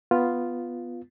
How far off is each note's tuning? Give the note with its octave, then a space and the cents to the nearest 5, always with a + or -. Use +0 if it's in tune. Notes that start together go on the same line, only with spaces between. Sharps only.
B3 +0 F4 +0